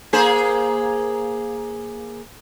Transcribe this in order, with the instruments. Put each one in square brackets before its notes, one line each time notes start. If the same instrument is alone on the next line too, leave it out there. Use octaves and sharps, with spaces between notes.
[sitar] A#3 G#4 C5